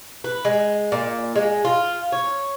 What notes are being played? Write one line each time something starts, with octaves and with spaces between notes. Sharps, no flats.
B4
G#3
A#2
G#3
F4
C#5